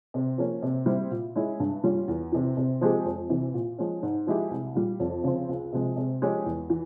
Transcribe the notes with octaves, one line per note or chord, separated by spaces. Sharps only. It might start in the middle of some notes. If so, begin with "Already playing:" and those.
C3
F3 A#3 C#4
C3
G3 C4 E4
A#2
G#3 C#4 E4
G2
G3 C#4 F4
E2
C3 E3
C3
F3 G#3 C4 G4
F2
C3 E3
A#2
F3 G#3 C#4
G#2
F3 G#3 E4 G4
C2
A#2 G3
F2
C#3 F3 C4
C#2
C3 F3 G#3
C3
F3 G#3 C#4 G4
E2
E3